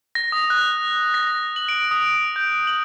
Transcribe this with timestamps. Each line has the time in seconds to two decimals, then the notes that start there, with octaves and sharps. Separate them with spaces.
0.15 A#6
0.32 D#6
0.50 F#6
1.14 A#6
1.56 F#7
1.69 D7
1.91 D#6
2.36 G6
2.67 F#7